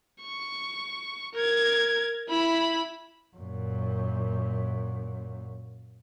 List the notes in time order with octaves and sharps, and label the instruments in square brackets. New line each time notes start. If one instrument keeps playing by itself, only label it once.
[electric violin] C#6
A#4 G#6
E4 B5
[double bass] F#2 A#2